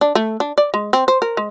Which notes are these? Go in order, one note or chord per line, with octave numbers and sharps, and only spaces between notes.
D4
A3
D4
D5
G#3
C4
C5
A#4
G#3